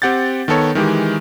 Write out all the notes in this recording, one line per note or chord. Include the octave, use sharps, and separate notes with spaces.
C4 G4 F#5 G6 A6
D#3 B3 A4 C#5
D#3 E3 G#3 G4